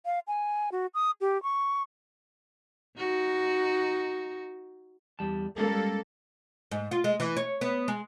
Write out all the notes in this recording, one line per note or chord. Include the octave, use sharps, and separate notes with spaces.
F5
G#5
F#4
D#6
G4
C#6
D#4 F#4
E2 G3 A5
G3 G#3 A#3 C#4 A4
G#2
F4
G#3
E3
C#5
B3
G#3